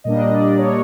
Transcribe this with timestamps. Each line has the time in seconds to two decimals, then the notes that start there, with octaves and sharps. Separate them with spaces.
0.04 A#2 G3 A#3 D4 D#5
0.31 D5
0.58 C#5